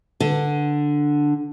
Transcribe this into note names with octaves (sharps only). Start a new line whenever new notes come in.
D3